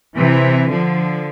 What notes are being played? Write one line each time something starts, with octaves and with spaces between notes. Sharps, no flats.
C3 E3
D3 F3